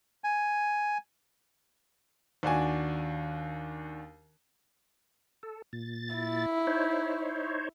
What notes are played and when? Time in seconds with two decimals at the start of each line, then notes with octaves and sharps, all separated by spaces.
0.24 G#5
2.43 D#2 D4 F#4 G#5
5.43 A4
5.73 A#2 A6
6.15 E4
6.67 D#4 C5 C#5